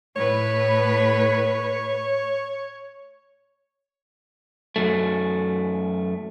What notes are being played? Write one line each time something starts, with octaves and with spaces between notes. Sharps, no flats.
A2 B4 C#5
F#2 A3